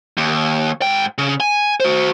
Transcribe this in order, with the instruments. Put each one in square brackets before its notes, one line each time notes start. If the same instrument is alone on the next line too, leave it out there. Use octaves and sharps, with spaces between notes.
[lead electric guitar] D#2
G#2 G5
C#3
G#5
F#4 C5